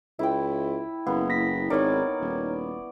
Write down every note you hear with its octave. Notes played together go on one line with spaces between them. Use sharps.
C#2 E4 G5
F#1 A#3 B3
A#6 B6
G#1 D#4 A#4 C#5 D5 C#6
D#1